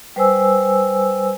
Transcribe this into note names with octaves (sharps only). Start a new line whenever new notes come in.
G3 B4 C5 G#5 E6